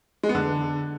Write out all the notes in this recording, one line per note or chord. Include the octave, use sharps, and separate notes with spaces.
G#3
B3
D3